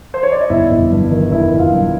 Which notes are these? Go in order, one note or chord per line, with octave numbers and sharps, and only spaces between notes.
C5
C#5
D5
D#5
G1 E4 E5
G1
G2
D#3
G1 E4 E5
G1
F4 F5
G2